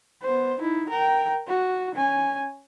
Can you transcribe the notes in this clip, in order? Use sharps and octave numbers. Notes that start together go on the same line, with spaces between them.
B3 C5
D#4 E4
A#4 G5
F#4
C#4 G#5